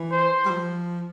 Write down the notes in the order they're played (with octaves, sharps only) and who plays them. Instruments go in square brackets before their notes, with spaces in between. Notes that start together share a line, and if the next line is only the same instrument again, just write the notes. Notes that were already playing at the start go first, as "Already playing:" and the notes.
Already playing: [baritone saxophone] E3
[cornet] C5
[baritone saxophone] G3
F3